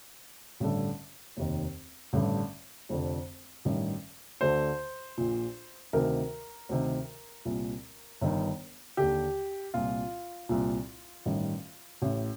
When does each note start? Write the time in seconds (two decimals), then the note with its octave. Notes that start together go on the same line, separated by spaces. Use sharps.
0.60 A1 G2 D3
1.37 F1 D#2 D#3
2.13 A1 G2 D3
2.89 F1 F2 D3
3.65 A1 G2 D#3
4.41 D2 D3 C5
5.17 A#1 A#2
5.93 D2 C3 D#3 A#4
6.69 D2 C3 D#3
7.45 C2 A#2
8.21 G1 G2 D#3
8.97 D#2 D3 G4
9.74 C2 A#2 F4
10.49 C2 A#2
11.26 A1 G2 D#3
12.02 A1 A2